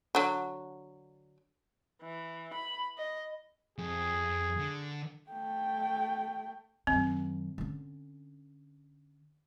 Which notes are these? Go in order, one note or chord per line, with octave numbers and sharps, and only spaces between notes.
D3 F#3
E3
B5
D#5
F2 G#4
D3
A3 G5
F#2 D#3 C4
D3 C#4